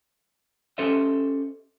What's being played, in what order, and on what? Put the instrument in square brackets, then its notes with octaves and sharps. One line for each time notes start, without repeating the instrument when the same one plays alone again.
[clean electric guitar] C#4 G4 A4 C5 D#5 E5